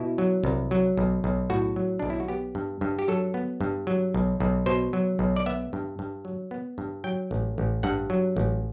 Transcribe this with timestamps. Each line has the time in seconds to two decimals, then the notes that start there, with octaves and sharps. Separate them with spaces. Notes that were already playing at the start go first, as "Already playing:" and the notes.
Already playing: B2 E4
0.18 F#3
0.44 C2
0.71 F#3
0.97 B1
1.24 B1
1.50 A2 F#4
1.76 F#3
1.99 B1 D4
2.10 E4
2.20 F#4
2.28 B3 G4
2.55 G2
2.81 G2
2.99 G4
3.08 F#3 A4
3.34 B3
3.61 G2
3.87 F#3
4.14 B1
4.40 B1
4.66 B2 C5
4.93 F#3
5.19 B1
5.36 D5
5.46 B3 E5
5.73 G2
5.99 G2
6.25 F#3
6.51 B3
6.78 G2
7.04 F#3 G5
7.31 A1
7.58 A1
7.83 G2 F#5
8.10 F#3
8.37 A1